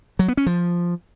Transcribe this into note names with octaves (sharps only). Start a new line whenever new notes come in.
F#3
B3
C#4
F3